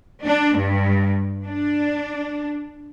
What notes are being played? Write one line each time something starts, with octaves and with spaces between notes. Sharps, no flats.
D4
G2
D4